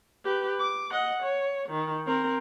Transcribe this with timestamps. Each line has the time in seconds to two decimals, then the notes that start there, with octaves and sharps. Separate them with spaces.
0.24 G4 B4
0.60 D6
0.92 D#5 F#5
1.23 C#5
1.69 D#3
2.07 C4 A#4